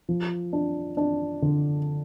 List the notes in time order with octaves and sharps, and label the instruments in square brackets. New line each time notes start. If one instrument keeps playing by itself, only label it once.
[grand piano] F3
D4
D4
D3